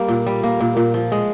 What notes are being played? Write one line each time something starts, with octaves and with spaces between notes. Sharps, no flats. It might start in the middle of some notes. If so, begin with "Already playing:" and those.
Already playing: G3 A#3
A#2
G3
A#3
A#2
A#2
F3
G#3